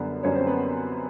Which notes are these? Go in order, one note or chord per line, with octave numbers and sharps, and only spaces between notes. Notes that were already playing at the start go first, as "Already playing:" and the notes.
Already playing: F#2 D3 G3 B3 B4
F#2 D3 G3 C#4 C#5
C4 C5
B3 B4